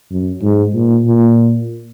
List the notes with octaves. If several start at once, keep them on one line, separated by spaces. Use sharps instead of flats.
F#2
G#2
A#2
A#2